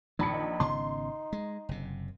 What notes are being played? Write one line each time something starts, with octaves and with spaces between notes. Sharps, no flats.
A#1 D#3 B5 C#7
D#4
G#1 C#3 B3 C6
G#3
F#1 C3